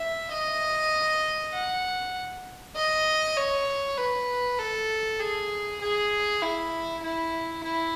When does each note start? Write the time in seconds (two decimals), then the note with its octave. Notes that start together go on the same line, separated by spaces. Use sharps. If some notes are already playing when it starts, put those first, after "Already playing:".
Already playing: E5
0.31 D#5
1.53 F#5
2.76 D#5
3.37 C#5
3.97 B4
4.58 A4
5.20 G#4
5.81 G#4
6.42 E4
7.03 E4
7.64 E4